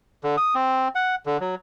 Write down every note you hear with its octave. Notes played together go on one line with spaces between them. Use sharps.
D3
D#6
C4
F#5
D3
F#3